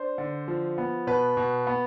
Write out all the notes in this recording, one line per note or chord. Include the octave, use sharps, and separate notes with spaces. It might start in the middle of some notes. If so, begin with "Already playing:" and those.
Already playing: D4 C5
D3
F3
B3
B2 B4
B2
B3